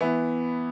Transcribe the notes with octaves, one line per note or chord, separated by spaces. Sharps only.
E3 B3 E4